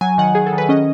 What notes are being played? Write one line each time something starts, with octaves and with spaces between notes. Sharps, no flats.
F#3 G#5
D#3 F#5
D#3 G#4
A4
D#3
B4
C#4 D#5